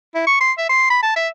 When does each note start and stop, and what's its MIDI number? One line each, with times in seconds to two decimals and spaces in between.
0.15 0.23 64
0.27 0.37 85
0.41 0.52 84
0.58 0.67 76
0.69 0.87 84
0.90 0.98 83
1.03 1.12 81
1.16 1.28 76